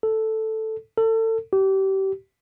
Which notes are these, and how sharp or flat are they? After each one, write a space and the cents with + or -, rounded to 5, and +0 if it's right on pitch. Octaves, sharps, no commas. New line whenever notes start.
A4 +0
A4 +30
G4 -30